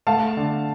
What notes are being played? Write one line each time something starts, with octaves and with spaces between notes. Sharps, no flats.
A3 F5 A5
D3